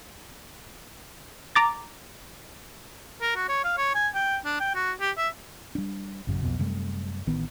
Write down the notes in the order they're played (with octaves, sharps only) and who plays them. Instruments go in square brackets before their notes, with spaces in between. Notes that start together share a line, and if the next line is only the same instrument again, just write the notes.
[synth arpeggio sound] A#5 D6 A6
[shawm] A#4
F#4
C#5
F5
C#5
G#5
G5
D4
G5
F#4
G4
E5
[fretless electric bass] G3 D4
A1 F#2 C#3
B1 F2 B2
F#2 C3 G3 A3
A1 D#3 B3